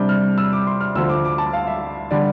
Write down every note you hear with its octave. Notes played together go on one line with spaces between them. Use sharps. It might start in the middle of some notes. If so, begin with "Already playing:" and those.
Already playing: C3 G3 D4 G6
F6
E6
D6
C6
F6
D2 D3 F3 E6
D6
D6
A5
F5
E5
D3 G3 D5